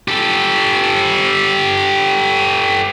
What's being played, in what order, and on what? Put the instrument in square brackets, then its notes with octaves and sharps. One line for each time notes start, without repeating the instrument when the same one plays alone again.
[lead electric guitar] G4 A4